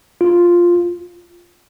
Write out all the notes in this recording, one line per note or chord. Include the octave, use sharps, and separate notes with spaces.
F4